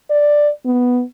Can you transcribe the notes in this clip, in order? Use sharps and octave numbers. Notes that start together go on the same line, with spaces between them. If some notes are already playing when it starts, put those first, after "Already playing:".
D5
B3